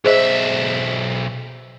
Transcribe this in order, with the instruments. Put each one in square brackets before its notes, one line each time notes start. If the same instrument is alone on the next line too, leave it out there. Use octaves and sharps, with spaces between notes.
[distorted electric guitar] B1 E5 [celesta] G#4 C5 D#5